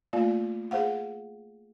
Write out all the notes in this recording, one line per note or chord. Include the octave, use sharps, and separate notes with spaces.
A3 A#3 F4 D5 F5
G#4 C5 F5 F#5